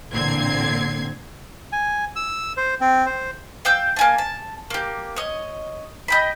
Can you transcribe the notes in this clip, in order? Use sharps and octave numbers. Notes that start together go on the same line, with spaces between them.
A1 A#2 D3 C4 G#6 C7
G#5
E6
C5
C4
C5
F5 G5 E6 G6
A#3 G#5 A5
A5
A#3 G4
C#5 D#5
D#5 G5 B5